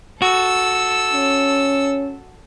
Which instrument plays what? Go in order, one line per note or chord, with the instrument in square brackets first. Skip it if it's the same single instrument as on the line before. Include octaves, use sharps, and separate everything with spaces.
[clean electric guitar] F#4 [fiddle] A4 E6
[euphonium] C#4